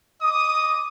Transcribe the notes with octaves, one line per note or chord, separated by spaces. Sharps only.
D#5 D6 D#6